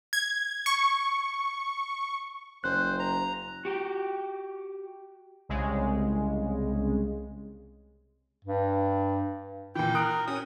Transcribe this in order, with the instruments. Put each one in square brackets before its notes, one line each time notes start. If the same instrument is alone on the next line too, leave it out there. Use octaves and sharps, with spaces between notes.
[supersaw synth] G#6
C#6
[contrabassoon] F#1 [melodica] C5 [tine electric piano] F#6
[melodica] A#5
[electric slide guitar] F#4 G4
[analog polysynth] C2 C#3 G#3
[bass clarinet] G2
[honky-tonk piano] A#2 E3 [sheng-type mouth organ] G5
[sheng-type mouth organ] A#4 [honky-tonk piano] D#6 F#6 D7
[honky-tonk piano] C#4 [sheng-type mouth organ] D#6